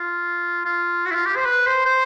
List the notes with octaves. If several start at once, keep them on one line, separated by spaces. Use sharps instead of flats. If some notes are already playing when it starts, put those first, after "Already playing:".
Already playing: F4
F4
F#4
E4
F4
G4
C5
B4
C5
C5